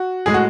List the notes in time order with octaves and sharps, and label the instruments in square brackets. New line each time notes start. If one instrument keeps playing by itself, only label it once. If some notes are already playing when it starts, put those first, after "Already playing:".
Already playing: [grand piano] F#4
A2 G#3 G#4
F#4